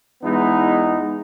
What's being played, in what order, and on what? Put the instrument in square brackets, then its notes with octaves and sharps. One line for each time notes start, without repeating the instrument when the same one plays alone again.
[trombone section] E2 G#3 B3 D#4 E4